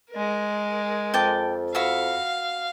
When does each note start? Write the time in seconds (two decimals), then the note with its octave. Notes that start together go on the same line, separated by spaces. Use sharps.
0.11 G#3 A#4
1.14 F2 G5 A5 D6
1.75 F#4 E5 F5 B5